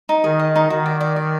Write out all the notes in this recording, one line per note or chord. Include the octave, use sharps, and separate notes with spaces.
D#4
D#3 G#4
D#5
D#4
D#3 F#4
D5
D5
D5